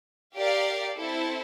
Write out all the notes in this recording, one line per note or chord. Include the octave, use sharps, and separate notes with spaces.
G4 A#4 D5 F5
C4 E4 A4